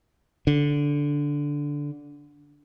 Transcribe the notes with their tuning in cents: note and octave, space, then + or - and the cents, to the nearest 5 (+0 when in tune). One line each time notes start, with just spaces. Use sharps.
D3 -10